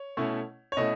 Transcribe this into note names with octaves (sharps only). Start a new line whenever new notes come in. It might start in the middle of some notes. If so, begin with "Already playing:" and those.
Already playing: C#5
B2 A3 C#4 E4
C#5
B2 A3 C#4 E4 D#5